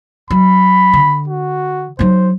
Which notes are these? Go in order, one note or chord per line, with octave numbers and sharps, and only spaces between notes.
F#3 B5
D3
F#4
F#3 D#4 C5